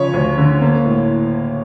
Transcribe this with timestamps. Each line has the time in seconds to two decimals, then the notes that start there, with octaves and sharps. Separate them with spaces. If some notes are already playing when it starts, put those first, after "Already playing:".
Already playing: C#3 F3 C#5
0.13 D2
0.37 D3
0.61 A#3
0.85 A2